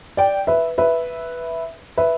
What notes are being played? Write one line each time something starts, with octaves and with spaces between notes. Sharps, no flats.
D5 G5
B4 E5
B4 E5
B4 E5